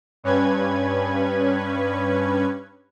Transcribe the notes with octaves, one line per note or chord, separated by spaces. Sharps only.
G2 C#4 B4 G#6